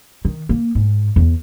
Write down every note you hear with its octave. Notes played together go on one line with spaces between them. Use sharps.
D#3
A#3
G#2
E2